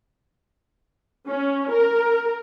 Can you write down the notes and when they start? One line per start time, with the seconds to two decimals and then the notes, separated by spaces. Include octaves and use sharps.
1.28 C#4
1.71 A#4